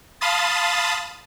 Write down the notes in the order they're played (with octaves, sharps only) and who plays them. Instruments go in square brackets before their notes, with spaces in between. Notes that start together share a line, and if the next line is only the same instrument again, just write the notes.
[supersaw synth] F5 A5 B5 C6 D#6 A6